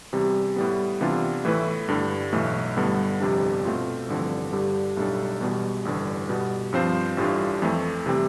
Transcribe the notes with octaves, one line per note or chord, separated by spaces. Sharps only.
E2 C3 G3
A2 G3 B3
C3 E3 B3 D4 F4
A2 E3 A3 E4 B4
G2 D3 G3
B1 A2 E3 A3
G2 D3 G3 B3
G1 F2 C3 G3 D4
B2 A3 C4 F4
A1 G2 D3 F3 C4
G2 D3 G3 D4 G4
B1 A2 G3 D4 A4
E2 B2 G3
A1 G2 D3
B2 G3 B3
G2 F3 C4 F4 C5
A1 A2 G3 D4 F4
F2 E3 A3
C3 E3 G3 C4